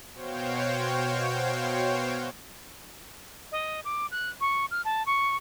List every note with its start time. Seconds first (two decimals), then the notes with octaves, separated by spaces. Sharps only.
0.13 B2 F#4 C5 C#5 F5 G5
3.52 D#5
3.85 D6
4.11 F#6
4.41 C#6
4.71 F6
4.85 A5
5.06 C#6